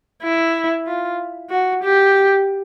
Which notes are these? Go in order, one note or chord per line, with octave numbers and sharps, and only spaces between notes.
E4
F4
F#4
G4